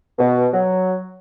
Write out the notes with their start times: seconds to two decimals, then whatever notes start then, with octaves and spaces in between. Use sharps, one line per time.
0.19 B2
0.53 F#3